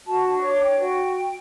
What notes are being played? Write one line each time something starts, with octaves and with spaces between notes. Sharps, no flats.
F#4 A5
D4 A5
C#6
C#5
D6
D4 G5
F#4